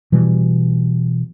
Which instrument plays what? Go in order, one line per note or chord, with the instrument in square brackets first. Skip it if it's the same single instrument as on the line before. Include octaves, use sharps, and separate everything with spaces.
[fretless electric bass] B2 E3 G3